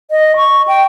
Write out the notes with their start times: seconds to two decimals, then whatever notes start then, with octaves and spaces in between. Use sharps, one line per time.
0.11 D#5
0.37 C#6
0.68 G5